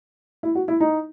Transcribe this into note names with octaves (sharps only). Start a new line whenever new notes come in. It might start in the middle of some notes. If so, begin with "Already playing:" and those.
E4
F#4
E4
D#4